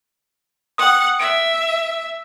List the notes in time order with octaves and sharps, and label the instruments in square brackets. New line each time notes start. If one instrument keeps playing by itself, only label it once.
[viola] F#5 [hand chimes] G5 D#6
[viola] E5 [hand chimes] D7